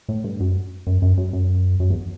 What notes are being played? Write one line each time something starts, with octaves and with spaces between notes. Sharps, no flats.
A2
G2
F#2
F#2
F#2
F#2
F#2
F#2
E2